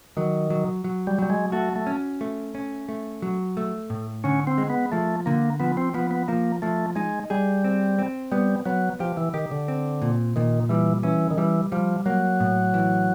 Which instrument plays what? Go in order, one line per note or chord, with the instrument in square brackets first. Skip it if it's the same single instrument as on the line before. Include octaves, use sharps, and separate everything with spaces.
[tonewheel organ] D#3 [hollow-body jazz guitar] F#3
[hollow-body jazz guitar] F#3
F#3
[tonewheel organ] G3
[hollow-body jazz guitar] F#3 [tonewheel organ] G3
[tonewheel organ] G#3
[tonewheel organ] A3 [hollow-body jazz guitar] F#4
[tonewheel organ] A3
[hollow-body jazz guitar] C#4
A3
C#4
A3
F#3
A3
A2
[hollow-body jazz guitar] D3 [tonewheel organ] C#4
[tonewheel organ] C4
[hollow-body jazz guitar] G#3
[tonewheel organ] B3
[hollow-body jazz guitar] F3 [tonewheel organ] A3
[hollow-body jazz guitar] D3 [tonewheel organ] A#3
[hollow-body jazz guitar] F3 [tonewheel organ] B3
[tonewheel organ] C4
[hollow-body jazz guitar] F3 [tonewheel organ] B3
[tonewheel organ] B3
[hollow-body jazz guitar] F3 [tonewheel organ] A#3
[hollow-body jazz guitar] F3 [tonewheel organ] A3
[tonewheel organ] G#3 [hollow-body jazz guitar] D#4
[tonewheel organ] G3 [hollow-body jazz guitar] G#4
[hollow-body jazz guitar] C4
C4
[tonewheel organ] G3 [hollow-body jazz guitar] B3
[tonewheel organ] F#3 [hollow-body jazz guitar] B3
[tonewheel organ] F3 [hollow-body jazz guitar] G4
[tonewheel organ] E3
[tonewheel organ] D#3 [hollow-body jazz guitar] G4
[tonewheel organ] D3
[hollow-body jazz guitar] C4
A#2
[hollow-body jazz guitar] A#2 [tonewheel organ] D#3
[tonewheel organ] E3 [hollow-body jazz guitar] G3
[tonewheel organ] E3 [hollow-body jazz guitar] C#4
[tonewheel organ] D#3
[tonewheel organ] E3 [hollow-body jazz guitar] G3
[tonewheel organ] F3 [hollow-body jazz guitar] G3
[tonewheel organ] F#3 [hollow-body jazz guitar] A#3
[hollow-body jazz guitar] A2
E3